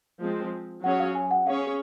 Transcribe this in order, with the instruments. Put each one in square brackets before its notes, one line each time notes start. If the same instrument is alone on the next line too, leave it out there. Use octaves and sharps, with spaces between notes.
[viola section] F3 G#3 C4
[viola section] F#3 C#4 G#4 C#5 [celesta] F#5
[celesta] F5
G#5
F#5
[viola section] C#4 G#4 C#5 [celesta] F5